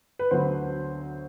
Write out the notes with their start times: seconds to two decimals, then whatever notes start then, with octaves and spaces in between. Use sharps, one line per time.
0.19 B4
0.31 D2 D3 F#3 B3 C5